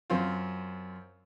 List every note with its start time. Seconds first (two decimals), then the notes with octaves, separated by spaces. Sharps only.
0.10 F#2 C4 F4